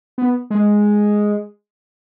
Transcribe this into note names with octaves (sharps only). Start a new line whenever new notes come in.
B3
G#3